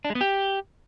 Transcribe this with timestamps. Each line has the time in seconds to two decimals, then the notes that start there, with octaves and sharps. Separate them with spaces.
0.05 D4
0.10 G#3
0.15 B3
0.21 G4